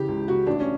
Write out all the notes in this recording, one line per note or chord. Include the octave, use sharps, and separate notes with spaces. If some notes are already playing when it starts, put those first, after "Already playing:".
Already playing: C#3 E3 G4
C#2
C#3 E3 F#4
A1 D4
C#4